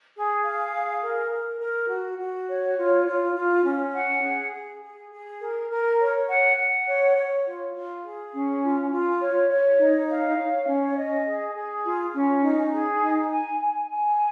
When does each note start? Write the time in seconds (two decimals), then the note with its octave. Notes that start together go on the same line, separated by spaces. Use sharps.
0.14 G#4
0.43 F5
0.72 G#4
1.02 A#4
1.31 A#4
1.60 A#4
1.90 F#4
2.19 F#4
2.48 C#5
2.77 F4
3.07 F4
3.36 F4
3.65 C#4
3.94 F#5
4.23 G#4
4.53 G#4
4.82 G#4
5.11 G#4
5.40 A#4
5.70 A#4
5.99 C#5
6.28 F#5
6.58 F#5
6.87 C#5
7.16 C#5
7.45 F4
7.75 F4
8.04 G#4
8.33 C#4
8.62 F4
8.92 F4
9.21 C#5
9.50 C#5
9.79 D#4
10.09 F5
10.38 C#5
10.67 C#4
10.97 D#5
11.25 G#4
11.55 G#4
11.84 F4
12.14 C#4
12.43 D#4
12.72 G#4
13.01 D#4
13.31 G#5
13.60 G#5
13.89 G#5